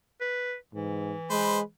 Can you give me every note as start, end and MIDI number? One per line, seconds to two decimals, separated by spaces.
0.21 0.55 71
0.74 1.14 44
0.74 1.72 52
1.30 1.62 56
1.30 1.58 71
1.30 1.58 72